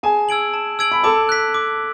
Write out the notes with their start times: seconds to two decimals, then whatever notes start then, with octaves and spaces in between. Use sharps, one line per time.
0.03 G#4 G#5 A5
0.29 E6 G#6 D7 F#7
0.54 A5
0.79 E6 G#6 D7 F#7
0.92 B5
1.03 A4 A5 D6
1.29 F#6 B6
1.54 D6